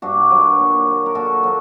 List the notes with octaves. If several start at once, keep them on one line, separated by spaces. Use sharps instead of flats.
G2 D4 F#4
D#3 F#3
A#2
F#3
A#4
A#2 F#4 A4
F#3